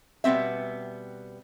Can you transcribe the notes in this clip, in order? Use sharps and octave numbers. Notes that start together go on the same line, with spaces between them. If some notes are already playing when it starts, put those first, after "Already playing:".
B2 G3 B3 C4 E5